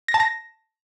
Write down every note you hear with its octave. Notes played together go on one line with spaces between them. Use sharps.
A#6
A5
A#6